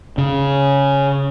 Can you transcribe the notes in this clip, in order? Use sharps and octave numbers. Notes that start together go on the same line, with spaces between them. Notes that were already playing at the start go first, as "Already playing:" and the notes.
C#3